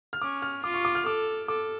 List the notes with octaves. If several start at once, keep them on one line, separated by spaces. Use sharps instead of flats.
F6
C#4 D6
F6
F4 D6
C#6
D6
F6
A4 D6
A4 D6